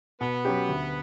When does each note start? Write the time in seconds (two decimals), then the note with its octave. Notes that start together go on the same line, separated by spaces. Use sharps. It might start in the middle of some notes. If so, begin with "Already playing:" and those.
0.20 B2 B3
0.45 F#3 C#4 G4
0.69 D2